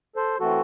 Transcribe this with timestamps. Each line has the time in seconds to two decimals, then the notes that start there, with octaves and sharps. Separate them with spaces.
0.16 A4 C5
0.40 E3 A3 C4 F#4 A4